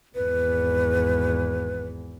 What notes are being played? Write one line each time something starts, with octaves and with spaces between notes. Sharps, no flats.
G#1 E2 B4